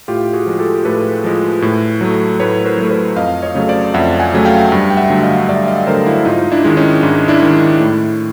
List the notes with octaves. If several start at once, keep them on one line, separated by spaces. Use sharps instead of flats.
A2 F4 G4
F#4 G#4
F3 G#3
G4 A4
A2 A4 B4
F3 G#3
A2
F#3 A3
A2 B4 C#5
A#4 C5
F#3 A3
B4 C#5
F2 D#5 F5
C#5 D#5
C#3 F#3 A3
C5 D5
F2 E5 F#5
F#5 G#5
C#3 F#3 A3
F5 G5
G2
G5
E5 F#5
D3 F#3 A3
D#5 F5
G2 D5 E5
D#5 F5
D3 F#3 A3 A#4 C5
E4 F#4
G#2 D#4 F4
D4 E4
D#3 G#3
C#4 D#4
G#2 D4 E4
D4 E4
D#3 G#3
A2